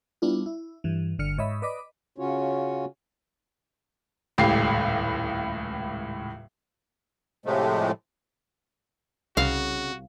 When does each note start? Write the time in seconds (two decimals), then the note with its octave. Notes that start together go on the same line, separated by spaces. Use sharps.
0.22 G3 B3 D4 E4 F4
0.46 E4
0.84 G2 E3
1.19 G1 D3 F6 C#7
1.38 G#2 C#5 D#5 E5 B5
1.62 B4 D5 D#5 B5 D6
2.18 C#3 C#4 F4 F#4 C#5
4.38 D#1 C#2 A2 G4 C7
7.46 A2 C3 F3 G#3 A3
9.37 C2 C#3 F#4 F5